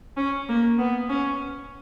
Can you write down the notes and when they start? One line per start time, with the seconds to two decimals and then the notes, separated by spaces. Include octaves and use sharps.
0.17 C#4
0.48 A#3
0.79 B3
1.10 C#4